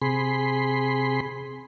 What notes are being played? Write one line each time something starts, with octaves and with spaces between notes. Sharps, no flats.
C3 G#4 B5 C6